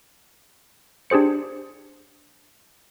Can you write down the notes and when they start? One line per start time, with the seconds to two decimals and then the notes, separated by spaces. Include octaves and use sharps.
1.10 D4 G4 G#4 C5 C#7